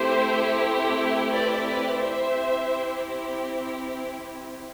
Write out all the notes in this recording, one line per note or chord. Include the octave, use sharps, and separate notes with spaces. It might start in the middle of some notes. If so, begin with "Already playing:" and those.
Already playing: A3 C4 E4 G4 C5
B4 D5
B4 D5
C4 E4 G4 C5 E5